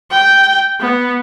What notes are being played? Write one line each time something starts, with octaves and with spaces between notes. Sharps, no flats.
G5
B3